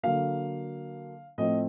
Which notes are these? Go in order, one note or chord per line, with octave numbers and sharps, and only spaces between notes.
D3 F#3 A#3 F5
A2 F3 A3 C4 D#5